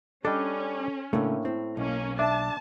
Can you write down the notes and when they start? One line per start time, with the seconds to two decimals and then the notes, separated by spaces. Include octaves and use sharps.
0.25 G3 C#4 D4 A4 D#5
1.13 A2 C#3 A3 A#3 D4
1.45 C4 E4
1.77 B1 A#3 C#4
2.19 D4 E5 A5